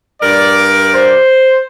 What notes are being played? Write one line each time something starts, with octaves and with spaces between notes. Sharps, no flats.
G2 A#4 D5
C5